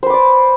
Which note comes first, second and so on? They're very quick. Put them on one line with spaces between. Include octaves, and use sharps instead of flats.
C5 B4 D6 D5